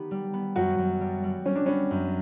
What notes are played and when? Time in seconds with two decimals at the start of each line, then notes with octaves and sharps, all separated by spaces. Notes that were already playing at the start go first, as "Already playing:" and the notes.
Already playing: D#3 B3 G4
0.11 G3
0.33 B3
0.56 F#2 F#4
0.78 F#2
1.01 G3
1.23 G3
1.46 G3 C#4
1.56 D4
1.66 B3 C#4
1.91 F#2